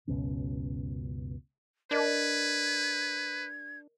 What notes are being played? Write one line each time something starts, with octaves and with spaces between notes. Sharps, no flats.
F#1 C#2 B2 C#4
D4 A#4 B4 D5 D#5 G#6